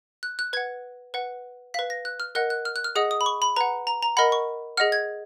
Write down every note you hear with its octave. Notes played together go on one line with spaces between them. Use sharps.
F#6
F#6
B4 F#5 G#6
B4 F#5
B4 F5 B6
A#6
F#6
F6
A#4 D#5 F#5 F#6
F#6
F6
F#6
F6
G#4 D#5 F#5 D#6
D#6
B5
C#6
B5
B4 F#5 A#5
A#5
A#5
A#4 D#5 F#5 B5
C#6
G#4 D#5 F#5 F6
G#6